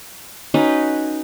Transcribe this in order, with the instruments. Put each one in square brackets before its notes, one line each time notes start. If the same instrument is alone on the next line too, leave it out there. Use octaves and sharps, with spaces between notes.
[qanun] C#4 D#4 F#4 B4